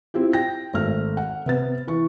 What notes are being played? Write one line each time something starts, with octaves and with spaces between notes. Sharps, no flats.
C4 E4 F4 G4
G5 A#6
G#1 A3 F6
F#5
C3 B3 A6
E3 C#6